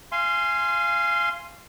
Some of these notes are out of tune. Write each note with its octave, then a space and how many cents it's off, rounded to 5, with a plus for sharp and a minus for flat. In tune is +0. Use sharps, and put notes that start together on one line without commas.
F5 -25 G#5 +0 C6 +0